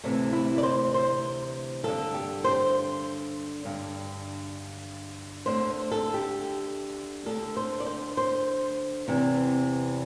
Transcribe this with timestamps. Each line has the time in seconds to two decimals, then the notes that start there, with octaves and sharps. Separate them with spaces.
0.04 D2 C3 E3 A3
0.33 E4
0.58 D5
0.63 C5
0.94 C5
1.83 G2 D3 A4
2.14 G4
2.44 C5
3.65 G2 D3
5.46 D2 D3 C5
5.92 A4
6.14 G4
7.26 D2 D3 A4
7.57 C5
7.80 D5
7.86 C5
8.17 C5
9.08 E2 C3 E3